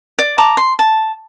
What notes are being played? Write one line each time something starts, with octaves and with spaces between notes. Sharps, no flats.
D5
A5 A#5 D6
C6
A5